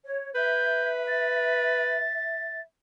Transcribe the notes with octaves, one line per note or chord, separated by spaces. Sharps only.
C#5
B4 E5 G6
A6